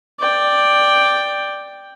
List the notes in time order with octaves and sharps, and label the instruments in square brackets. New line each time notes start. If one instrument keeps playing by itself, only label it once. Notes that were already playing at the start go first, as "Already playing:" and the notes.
[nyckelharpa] D5 G5